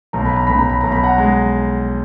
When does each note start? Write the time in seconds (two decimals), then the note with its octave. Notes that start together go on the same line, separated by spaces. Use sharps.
0.13 B1 A#5
0.25 B5
0.36 A#5
0.47 B1 B5
0.58 A#5
0.69 B5
0.81 B1 A#5
0.92 B5
1.03 F#5 A#5
1.18 G#3